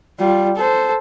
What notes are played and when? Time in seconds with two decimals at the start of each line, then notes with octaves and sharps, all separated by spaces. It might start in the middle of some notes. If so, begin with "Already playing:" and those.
0.19 G3 F4
0.56 A4 C5